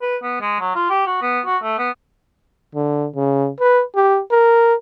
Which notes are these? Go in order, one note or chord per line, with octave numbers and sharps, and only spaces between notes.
B4
B3
G#3
F#3
F4
G4
F#4
B3
F#4
A3
B3
D3
C#3
B4
G4
A#4